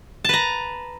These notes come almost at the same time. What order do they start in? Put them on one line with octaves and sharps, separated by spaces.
A5 B4 A#5